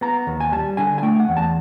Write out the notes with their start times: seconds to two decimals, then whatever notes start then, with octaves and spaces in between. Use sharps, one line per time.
0.01 B3 A#5
0.27 D#2
0.40 G#5
0.52 G3 A5
0.77 D3 G#5
0.98 G#5
1.03 A3 G5
1.20 F#5
1.29 E2
1.37 A5